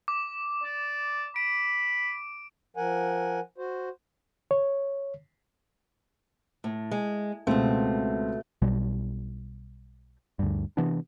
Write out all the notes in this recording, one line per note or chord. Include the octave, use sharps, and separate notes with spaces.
D6
D5
B5 D7
F3 A#4 F#5 G#5
F#4 C5
C#5
A2
G#3
C#2 B2 A3 C4
B1 B2 G3
D2 G2
C3 E3 B3 D4